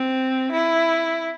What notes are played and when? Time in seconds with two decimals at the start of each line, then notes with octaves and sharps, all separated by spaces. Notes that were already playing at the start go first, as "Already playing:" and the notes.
Already playing: C4
0.52 E4